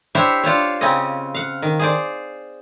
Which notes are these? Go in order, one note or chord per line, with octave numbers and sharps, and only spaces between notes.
D4 E4 G4 C5 C#5 E5
D4 F4 C5 C#5
C#3 C4 C#4 D#5
F5 F#5
D#3
G#4 C5 D5